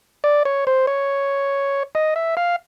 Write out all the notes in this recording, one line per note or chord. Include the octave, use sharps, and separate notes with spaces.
D5
C#5
C5
C#5
D#5
E5
F5